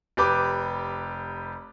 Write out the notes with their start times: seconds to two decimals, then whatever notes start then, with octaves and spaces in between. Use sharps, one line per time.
0.17 F1 G4 B4 D6